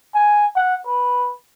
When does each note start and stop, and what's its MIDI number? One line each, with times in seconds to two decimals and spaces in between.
0.15 0.46 80
0.56 0.75 78
0.86 1.32 71